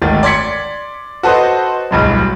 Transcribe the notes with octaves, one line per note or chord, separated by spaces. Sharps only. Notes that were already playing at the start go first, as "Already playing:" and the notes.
G#1 D2 D#3 A6
D5 C6 G#6 B6 C#7
F#4 A4 B4 C5 D#5
D1 B1 G2 G#3